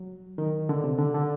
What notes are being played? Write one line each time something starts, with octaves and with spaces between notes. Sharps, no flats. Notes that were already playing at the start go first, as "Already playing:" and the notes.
Already playing: F#3
D#3
D3
C3
D3
D3